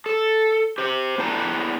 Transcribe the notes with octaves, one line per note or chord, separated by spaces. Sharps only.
A4
G4 C5
B3 D4 E4 B4 A5 A#5